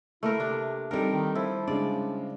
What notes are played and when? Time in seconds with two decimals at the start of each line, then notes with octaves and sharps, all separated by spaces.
0.23 A3 A#3 E4 A#4
0.40 C3 D4
0.91 G3 C4 D#4 A4 A#4
1.11 D#3
1.35 F3 E4
1.67 C#3 G#3 D4 D5